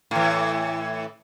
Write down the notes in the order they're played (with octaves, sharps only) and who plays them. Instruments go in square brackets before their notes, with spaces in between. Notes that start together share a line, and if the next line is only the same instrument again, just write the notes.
[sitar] A2 E3